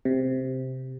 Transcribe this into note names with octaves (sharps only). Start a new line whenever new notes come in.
C3